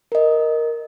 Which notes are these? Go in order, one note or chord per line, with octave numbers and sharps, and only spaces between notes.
A#4 D#5